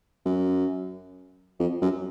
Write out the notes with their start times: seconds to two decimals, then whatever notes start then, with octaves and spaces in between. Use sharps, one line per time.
0.25 F#2
1.60 F2
1.82 F#2